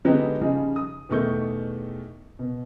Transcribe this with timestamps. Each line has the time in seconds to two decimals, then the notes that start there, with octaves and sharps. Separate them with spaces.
0.05 D3 F#3 G#3 B3 D#4 G4
0.41 C#3 F3 G3 D#4 G#4
0.76 D#6
1.09 E2 B2 D#3 A3 C#6 G6
2.39 B2